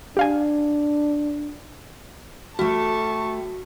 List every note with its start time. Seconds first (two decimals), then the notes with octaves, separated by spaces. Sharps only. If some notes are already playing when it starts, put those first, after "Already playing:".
0.17 D4 G4 F5 G#5
2.59 A3 F#4 G4 A5 C#6